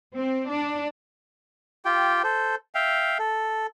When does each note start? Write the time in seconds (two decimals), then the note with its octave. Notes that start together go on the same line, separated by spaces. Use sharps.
0.15 C4
0.51 D4
1.85 F4 G4 G5
2.24 A4 C5
2.75 E5 F5 G5
3.19 A4